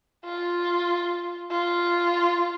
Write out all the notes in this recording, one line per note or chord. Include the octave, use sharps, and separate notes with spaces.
F4
F4